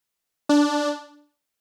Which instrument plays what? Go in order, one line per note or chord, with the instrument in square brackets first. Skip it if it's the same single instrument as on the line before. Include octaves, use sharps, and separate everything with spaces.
[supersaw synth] D4